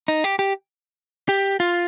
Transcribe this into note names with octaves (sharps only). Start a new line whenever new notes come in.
D#4
G4
G4
G4
F4